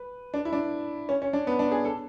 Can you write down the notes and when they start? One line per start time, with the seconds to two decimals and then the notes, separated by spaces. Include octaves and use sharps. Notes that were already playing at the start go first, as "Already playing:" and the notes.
Already playing: B4
0.34 D4
0.45 E4
0.53 D4
1.09 C#4
1.22 C#4
1.33 D4
1.47 B3
1.59 D4
1.72 G#4
1.85 A4